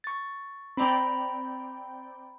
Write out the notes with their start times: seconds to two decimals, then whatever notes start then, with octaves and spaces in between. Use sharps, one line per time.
0.04 C#6 A6
0.77 C4 D5 G5 A#5 B5